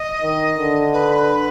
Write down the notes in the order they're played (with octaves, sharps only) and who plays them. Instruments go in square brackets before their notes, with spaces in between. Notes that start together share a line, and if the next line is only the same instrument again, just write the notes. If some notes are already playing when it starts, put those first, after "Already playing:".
Already playing: [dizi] D#5
[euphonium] D#3
D3
[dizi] B4